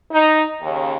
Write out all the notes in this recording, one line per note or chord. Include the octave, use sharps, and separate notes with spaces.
D#4
D#2 C#3